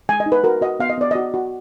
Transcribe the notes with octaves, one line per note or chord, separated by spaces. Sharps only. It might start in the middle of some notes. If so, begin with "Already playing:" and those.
G#3 G#5
D#5
D#4
B4
F#4 A#4
F#4 D#5
B3 F5
D#5
B3 D5
F#4 D#5
F#4